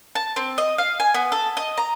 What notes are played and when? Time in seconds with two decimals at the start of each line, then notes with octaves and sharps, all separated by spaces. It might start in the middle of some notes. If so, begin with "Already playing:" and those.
0.15 A5
0.36 C4
0.58 D#5
0.78 F5
1.00 G#5
1.14 B3
1.32 A4
1.57 D#5
1.77 A#5